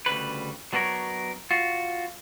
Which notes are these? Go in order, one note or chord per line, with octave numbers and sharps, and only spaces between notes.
D2 C#3 G3 B4
F#3 B3 D4 A4 A#4 C#5
F4 F#4